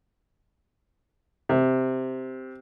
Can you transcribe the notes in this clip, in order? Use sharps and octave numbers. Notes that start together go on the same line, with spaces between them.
C3